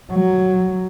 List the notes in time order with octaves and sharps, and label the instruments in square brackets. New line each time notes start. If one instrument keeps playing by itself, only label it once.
[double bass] F#3